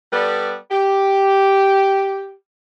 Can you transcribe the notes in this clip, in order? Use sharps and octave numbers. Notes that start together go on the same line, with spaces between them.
G3 B3 A4 B4 D5
G4